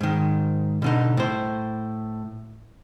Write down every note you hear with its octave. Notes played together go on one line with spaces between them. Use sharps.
G#2 D#3
B2 D3 D#4
A2 C5